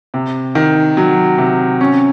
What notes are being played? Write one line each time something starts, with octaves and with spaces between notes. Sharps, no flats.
C3
D#3
F#3
C3
C#4